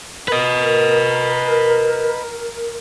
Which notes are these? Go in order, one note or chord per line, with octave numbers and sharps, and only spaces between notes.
A#4 B4 D#5